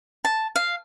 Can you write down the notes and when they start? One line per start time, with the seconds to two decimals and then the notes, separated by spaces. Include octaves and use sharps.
0.25 A5
0.56 F5